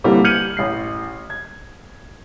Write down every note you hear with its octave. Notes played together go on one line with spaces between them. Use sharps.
D3 E3 G3 A#3 C4
F6 G6 G#6 C#7 D#7 F#7
A1 C7
G#6